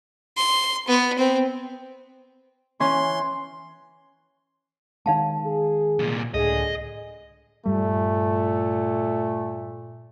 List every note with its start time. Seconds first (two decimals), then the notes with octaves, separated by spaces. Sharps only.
0.37 C6
0.88 B3
1.18 C4
2.80 E3 C#4 C6
5.06 D#3 G#3 D#4 F5 A5
5.44 G#4
5.99 C2 A#2
6.34 C#2 A2 D3 G#4 D#5
7.66 G2 A#2 G3 A3